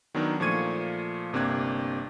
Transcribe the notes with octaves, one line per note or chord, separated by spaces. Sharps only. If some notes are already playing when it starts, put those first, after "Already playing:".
D#3 F#3 B3 D4 D#4 A#4
A#2 F3 A3 C#6 G#6 D#7
G1 C3 A#3 D4 F#6 G#6